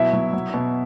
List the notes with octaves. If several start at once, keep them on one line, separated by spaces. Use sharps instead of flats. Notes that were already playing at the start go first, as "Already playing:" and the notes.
Already playing: B2 F#3 E4 E5
F#3
F#3
B2